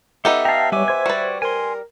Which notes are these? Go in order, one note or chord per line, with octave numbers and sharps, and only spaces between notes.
B3 D#4 G4 A4 E5
F5 G5 A5 A#5
G3 B4 C#5 E5 G#5 D6
C5 G#6
G3 F#4 B4 D5
A#4 G#5 C6